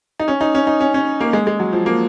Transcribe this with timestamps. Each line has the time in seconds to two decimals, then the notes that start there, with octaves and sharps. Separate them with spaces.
0.20 D#4
0.28 C#4
0.41 D#4
0.55 C#4
0.67 D#4
0.80 C#4
0.94 C#4
1.21 A#3
1.33 G#3
1.47 G#3
1.60 F#3
1.73 F3
1.86 A#3